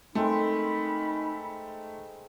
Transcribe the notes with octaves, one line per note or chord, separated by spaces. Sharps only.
G#3 A3 C4 D#4 A#4 B5